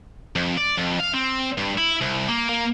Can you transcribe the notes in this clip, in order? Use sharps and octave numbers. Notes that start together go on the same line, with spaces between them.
F2
D5
F2
F5
C4
G2
E4
C2
A#3
A#3